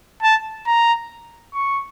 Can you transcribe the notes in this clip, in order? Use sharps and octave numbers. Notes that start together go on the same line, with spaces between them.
A5
A#5
C#6